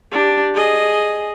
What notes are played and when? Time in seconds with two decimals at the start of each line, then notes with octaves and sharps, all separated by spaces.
0.12 D4 G4
0.54 G#4 D#5